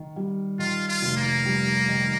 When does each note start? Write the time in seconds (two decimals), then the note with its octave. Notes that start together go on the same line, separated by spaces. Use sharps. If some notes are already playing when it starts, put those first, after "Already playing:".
Already playing: D#3
0.16 G3
0.59 D#3 F4
0.89 F4
1.02 F1
1.17 A#3
1.45 G3
1.88 D#3